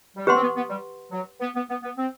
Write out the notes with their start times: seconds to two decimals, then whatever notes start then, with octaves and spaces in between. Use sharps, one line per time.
0.16 G3
0.27 A3 G4 B4 F#5 C6
0.36 C4
0.41 B3
0.56 B3
0.69 G3
1.11 F#3
1.40 B3
1.55 B3
1.69 B3
1.83 B3
1.97 C4